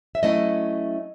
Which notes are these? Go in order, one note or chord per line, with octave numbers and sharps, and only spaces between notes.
E5
F#3 A3 C#4 E4 D#5